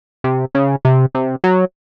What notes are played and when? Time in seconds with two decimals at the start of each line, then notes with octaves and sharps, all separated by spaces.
0.24 C3
0.55 C#3
0.85 C3
1.15 C3
1.44 F#3